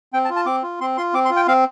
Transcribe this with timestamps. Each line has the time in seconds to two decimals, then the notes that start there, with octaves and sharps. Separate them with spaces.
0.13 C4 G5
0.25 A5
0.30 F4
0.36 A5
0.46 C4 D6
0.63 F4
0.80 C4 C6
0.97 F4 C6
1.14 C4 D6
1.25 C6
1.30 F4
1.36 G5
1.48 C4 F5